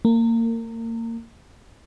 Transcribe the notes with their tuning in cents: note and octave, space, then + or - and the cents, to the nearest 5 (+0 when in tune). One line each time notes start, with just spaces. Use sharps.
A#3 -30